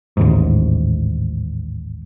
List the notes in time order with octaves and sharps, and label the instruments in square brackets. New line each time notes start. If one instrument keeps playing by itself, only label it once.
[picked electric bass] A1 D#2 G#2